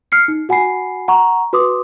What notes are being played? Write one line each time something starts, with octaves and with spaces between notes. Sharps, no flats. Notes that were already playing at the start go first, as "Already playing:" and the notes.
F6 C7 C#7
D#4
F#4 F#5 G#5 B5 C7
F#5 A#5 C#6
F#4 B4 C6 D6 D#6